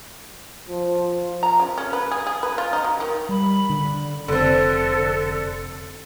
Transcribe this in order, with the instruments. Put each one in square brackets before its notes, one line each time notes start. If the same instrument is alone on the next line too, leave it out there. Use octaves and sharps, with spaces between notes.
[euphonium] F3
[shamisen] A#5
C#3
C#4
B4
G#4
G#4
B4
F4
D#4
F#3
D#3
[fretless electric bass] G3 [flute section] B5
[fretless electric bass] D3
[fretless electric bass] F1 [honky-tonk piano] D3 C4 [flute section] A4